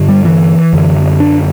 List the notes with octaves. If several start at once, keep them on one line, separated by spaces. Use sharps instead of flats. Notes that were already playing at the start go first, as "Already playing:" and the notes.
Already playing: G2 D3
G3
E3
F#2 D3
D4